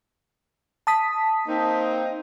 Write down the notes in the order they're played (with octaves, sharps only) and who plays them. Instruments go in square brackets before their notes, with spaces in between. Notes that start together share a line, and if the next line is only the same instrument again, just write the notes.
[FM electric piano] A5 D#6 B6
[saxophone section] A#3 C4 D#4